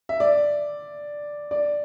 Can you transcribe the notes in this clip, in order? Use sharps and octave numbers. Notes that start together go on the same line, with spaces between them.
E5
D5
D5